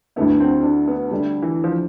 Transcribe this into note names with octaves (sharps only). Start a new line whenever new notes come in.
D2 D3 A3 B3 E4
C4
D4
B3
D3 G3 A3 D4
E3
F3